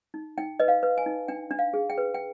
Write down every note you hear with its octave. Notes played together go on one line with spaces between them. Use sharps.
D#4
D#4 G5
B4 D#5
F5
B4
G#5
D#4
D4 G5
D4
F5
G#4
G5
B4
G5